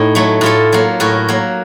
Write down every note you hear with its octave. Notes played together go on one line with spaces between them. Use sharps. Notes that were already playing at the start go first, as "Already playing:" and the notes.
Already playing: A2 D#4
F#3 A3
A2 F4 A4
F#3 A#3
A2 F#4 A#4
F#3 A#3